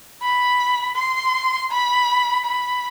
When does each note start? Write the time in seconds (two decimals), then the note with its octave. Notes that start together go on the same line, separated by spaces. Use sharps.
0.22 B5
0.96 C6
1.71 B5
2.44 B5